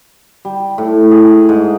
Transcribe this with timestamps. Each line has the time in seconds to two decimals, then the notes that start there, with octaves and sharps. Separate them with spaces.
0.45 G3
0.78 A2
1.11 G#4
1.49 G#2